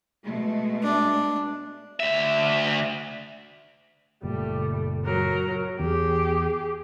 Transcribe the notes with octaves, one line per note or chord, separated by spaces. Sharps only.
B2 G#3 A3
D4
D2 E5
F#1 A#2 G3 A3
F#3 A#4
E2 G4 G#4